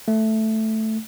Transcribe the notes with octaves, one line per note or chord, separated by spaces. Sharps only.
A3